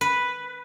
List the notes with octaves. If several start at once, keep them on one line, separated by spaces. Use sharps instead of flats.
B4